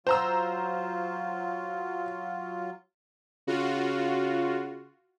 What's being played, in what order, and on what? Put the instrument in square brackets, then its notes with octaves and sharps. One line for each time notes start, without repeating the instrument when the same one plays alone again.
[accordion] F#3 F4 [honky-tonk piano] C5 A#5 E6
[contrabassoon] C#3 [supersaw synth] F4 F#4